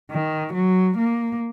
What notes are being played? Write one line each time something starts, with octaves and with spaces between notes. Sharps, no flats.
D#3
F#3
A#3